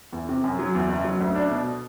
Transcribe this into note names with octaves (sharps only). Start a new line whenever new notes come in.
E2
C3
F#2
F#3
E2
F#1
F#3
D2
D4
B2